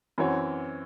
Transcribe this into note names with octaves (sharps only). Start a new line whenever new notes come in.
F#2 E3 C4 F#4 C#5